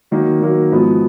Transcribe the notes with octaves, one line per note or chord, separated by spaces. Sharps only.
D#3 F#3 A#3
D#3 F#3 A#3
G#2 F3 B3 F#4